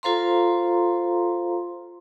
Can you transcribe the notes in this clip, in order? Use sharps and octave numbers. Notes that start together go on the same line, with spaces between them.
F4 A4 C5 F5 A#5 C6